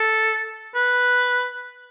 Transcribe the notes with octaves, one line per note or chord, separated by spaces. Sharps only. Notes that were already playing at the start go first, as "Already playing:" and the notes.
Already playing: A4
B4